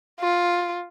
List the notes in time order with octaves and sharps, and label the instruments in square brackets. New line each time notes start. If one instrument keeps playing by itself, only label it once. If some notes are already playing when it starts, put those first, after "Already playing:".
[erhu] F4